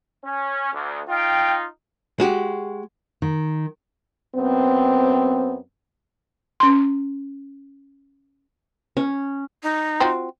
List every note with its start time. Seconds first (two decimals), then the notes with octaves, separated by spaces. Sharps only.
0.25 C#4
0.73 D2
1.09 D#4 F4 G5
2.20 G#3 F#4 G4
3.22 D#3
4.35 F#2 B3 C4
6.60 C#4 C6
8.97 C#4
9.63 D#4
10.00 C4 F4 F#4